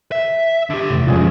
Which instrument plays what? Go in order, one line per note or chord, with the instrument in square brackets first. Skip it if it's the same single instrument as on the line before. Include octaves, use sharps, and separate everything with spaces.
[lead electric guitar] E5
D3 G4
[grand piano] F1 E2
[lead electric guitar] B1 F2 [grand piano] F3 G#3 C#4